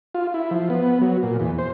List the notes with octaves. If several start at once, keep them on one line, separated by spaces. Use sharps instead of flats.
F4
E4
F3
B3
F#3
A#2
E2
C5